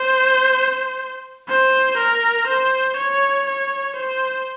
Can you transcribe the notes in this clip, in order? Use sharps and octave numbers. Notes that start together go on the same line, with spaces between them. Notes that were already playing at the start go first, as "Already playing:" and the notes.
Already playing: C5
C5
A#4
C5
C#5
C#5
C5